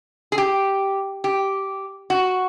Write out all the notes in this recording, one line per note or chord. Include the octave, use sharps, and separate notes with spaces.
G#4
G4
G4
F#4